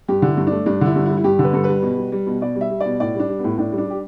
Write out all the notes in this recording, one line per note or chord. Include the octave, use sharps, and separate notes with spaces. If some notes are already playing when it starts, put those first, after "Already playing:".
G2 G4
D3 E4
G2
A3 D4
G2 D4
D3 E4
G2
E4
G3
E4
G2 G4
D3 B4
G2 A4
G3 B4
B2
G3
G3
B2
B2 D5
G3
E5
G3
D5
B2
A2 D5
G3 D4
G3
A2 B3
A2 D4
G3
D4
G3 G4